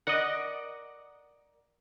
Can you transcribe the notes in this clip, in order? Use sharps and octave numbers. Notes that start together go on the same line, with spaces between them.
A#4 D5 D#5 F#5